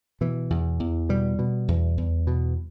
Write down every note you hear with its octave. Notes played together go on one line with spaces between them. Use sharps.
B2 E3
E2
E2
B2 G3
B2
E2
E2
B2